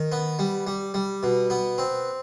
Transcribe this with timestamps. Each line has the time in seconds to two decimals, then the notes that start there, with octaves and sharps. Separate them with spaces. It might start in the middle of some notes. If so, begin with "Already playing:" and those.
Already playing: D#3
0.12 B3
0.39 G3
0.67 G3
0.94 G3
1.23 B2
1.50 B3
1.78 C4